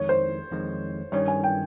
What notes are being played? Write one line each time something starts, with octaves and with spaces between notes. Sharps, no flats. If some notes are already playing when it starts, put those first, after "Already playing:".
Already playing: F2 D#3 G#3 C#5
C5
F2 D#3 G#3
G2 D#3 G3 C#4 C#5
G#5
G5